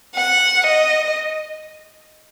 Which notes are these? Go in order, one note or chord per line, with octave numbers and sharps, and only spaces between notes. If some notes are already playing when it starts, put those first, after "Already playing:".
F#5
D#5